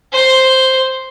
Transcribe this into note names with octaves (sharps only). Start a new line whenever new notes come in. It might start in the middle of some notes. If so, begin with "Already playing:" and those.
C5